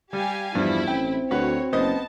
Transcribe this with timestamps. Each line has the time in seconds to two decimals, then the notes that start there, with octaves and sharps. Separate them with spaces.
0.13 G3 G4 F5 G#5
0.55 E2 G2 F3 G3 E4
0.88 A1 C4 G5
1.31 D2 F#4 B4 C#5
1.73 F#1 B3 C5 D#5 A5